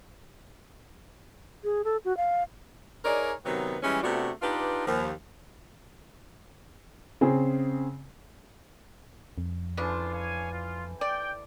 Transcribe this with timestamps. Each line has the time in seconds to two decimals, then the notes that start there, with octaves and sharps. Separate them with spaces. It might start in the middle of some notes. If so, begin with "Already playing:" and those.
1.64 G#4
1.84 A4
2.05 F#4
2.17 F5
3.05 D#4 G#4 A#4 C#5 D5
3.45 C3 D#3 F#3 B3
3.83 E3 G3 G#3 C#4
4.03 C3 A3 B3 D4 F4 F#4
4.42 D4 D#4 F4 G4 B4
4.87 D#2 F3 A#3
7.21 C#3 C4 G#4
9.38 F2
9.77 C#3 E3 D4 F4 A4 C5
10.13 C#5 F5 G#5
10.52 F4
11.01 D5 G5